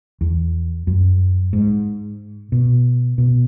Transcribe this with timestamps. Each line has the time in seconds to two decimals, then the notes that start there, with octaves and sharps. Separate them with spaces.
0.21 E2
0.87 F#2
1.53 G#2
2.52 B2
3.18 B2